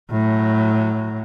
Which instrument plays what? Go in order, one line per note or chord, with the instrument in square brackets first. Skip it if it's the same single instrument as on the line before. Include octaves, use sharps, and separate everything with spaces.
[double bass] A2 F#3